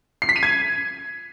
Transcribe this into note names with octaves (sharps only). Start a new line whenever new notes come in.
C7
B6
D#7
G#6